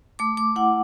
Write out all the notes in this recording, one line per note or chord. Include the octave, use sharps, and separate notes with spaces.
A3 D6
D6
E4 F#5